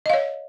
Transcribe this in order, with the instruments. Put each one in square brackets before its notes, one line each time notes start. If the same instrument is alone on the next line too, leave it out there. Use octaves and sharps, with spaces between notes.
[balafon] D#5
F5
C#5